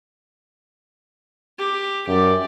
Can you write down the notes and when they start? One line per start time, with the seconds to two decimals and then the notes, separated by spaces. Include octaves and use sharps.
1.59 G4
2.07 F#2 G4 D5